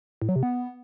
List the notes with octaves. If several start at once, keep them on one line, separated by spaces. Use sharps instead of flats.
A2
F#3
C3
B3